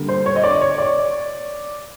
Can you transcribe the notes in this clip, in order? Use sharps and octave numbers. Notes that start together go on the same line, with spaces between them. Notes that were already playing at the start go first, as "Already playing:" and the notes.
Already playing: D3 G3 A#3
C5
C#5
D#5
D5
C#5
D5